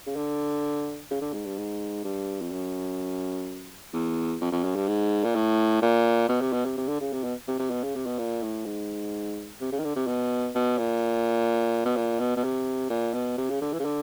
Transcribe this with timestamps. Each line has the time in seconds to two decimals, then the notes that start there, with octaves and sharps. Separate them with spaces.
0.07 C#3
0.16 D3
1.11 C#3
1.21 D3
1.33 G#2
1.46 G2
1.57 G#2
2.04 G2
2.42 F2
2.51 F#2
3.93 E2
4.41 F2
4.52 F2
4.64 F#2
4.76 G2
4.88 G#2
5.24 A#2
5.35 A2
5.82 A#2
6.29 B2
6.41 C3
6.53 B2
6.65 C3
6.77 C3
6.88 D3
7.01 C#3
7.13 C3
7.24 B2
7.48 C3
7.59 C3
7.71 B2
7.84 C#3
7.95 C3
8.06 B2
8.18 A#2
8.43 A2
8.66 G#2
9.61 C3
9.72 C#3
9.79 D#3
9.84 D3
9.96 C3
10.07 B2
10.55 B2
10.79 A#2
11.85 B2
11.96 A#2
12.20 B2
12.36 B2
12.44 C3
12.90 A#2
13.14 B2
13.38 C3
13.50 C#3
13.61 D3
13.73 E3
13.80 C#3
13.85 D3